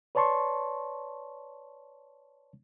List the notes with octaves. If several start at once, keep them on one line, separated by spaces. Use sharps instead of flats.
B4 C#5 D5 A5 C6 C#6